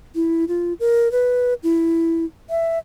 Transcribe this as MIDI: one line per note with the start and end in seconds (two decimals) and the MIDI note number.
0.15 0.45 64
0.48 0.73 65
0.80 1.11 70
1.12 1.54 71
1.63 2.25 64
2.50 2.79 76